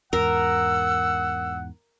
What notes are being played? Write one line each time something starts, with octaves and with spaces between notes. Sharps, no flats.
E2 G#2 A#4 F#5 E6